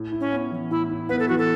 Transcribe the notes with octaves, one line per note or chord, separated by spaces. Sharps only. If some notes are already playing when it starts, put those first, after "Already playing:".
Already playing: A2
E4
C#4
B3
E3
A2 E4
E4
B3 B4
A4
E3 F#4
A4